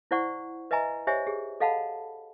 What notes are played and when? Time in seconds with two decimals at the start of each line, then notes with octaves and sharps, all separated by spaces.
0.11 E4 C5 D5 F#5 C#6
0.71 B4 D#5 E5 G#5 A#5
1.07 G4 C5 C#5 D#5 E5 G#5
1.27 G4 G#4
1.60 A4 D#5 F5 F#5 A5 B5